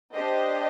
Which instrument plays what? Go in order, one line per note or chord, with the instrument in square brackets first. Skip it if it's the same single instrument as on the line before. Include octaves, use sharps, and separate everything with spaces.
[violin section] D4 G4 C5 D#5